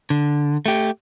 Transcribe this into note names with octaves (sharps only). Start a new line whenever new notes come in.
D3
A3 G4